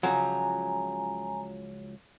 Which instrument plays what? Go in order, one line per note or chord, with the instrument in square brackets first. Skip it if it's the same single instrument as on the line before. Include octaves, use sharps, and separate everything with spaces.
[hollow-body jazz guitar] C#2 F3 F#3 [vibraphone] G#5 A#5